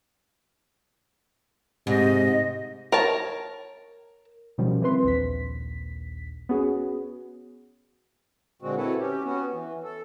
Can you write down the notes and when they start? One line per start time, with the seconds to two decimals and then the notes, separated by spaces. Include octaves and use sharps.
1.87 G#2 C3 D#5
2.92 A#4 C#5 A5
4.58 B2 D#3 F3 G3 C#4
4.82 E3 C4 B4 C6
5.04 A#1 D#2 B6
6.49 B3 C#4 F#4 G#4
8.62 A#2 D3 G#3 C4 F#4
8.77 C4 E4 F#4 A4 B4 C#5
8.99 C#4 G4
9.24 B3 C#4 F#4
9.53 E3
9.84 A4